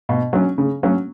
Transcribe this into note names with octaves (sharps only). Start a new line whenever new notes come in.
B2
F#3 C#4
C#3
F#3 C#4